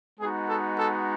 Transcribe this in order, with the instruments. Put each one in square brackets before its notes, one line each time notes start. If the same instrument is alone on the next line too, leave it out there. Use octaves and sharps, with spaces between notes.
[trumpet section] G#3 B3 D#4 F#4 G#4
A4
A4